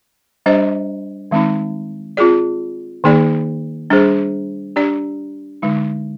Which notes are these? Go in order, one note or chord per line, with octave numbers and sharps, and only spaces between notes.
G3 D4 G4 C5 D#5
D#3 G#3 C4 D#4
C4 F4 G#4 D5
D#3 A#3 D#4 G#4 D5
G3 D4 G#4 C5
D4 G4 D5
D3 G#3 D#4